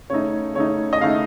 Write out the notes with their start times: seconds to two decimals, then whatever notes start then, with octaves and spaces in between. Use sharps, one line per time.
0.10 C#3 A3 D#4 C#5
0.55 C#3 A3 D#4 C#5
0.93 D#5
1.01 C#3 A3 D#4 F5